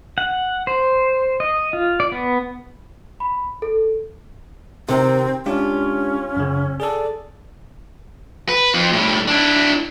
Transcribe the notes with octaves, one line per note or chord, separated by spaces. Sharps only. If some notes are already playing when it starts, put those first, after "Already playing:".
F#5
C5
D#5
F4
D5
B3
B5
A4
C3 D#3 C4
G#3 C#4 D4 F4 G4
F#2 C#3
G#4 A4 D5
B4
F2
A2 G3
D4 E4